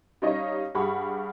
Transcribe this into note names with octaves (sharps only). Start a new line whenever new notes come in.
G3 C#4 D#4 C#5 D#5 F5
G2 G4 G#4 F#5 B5 C#6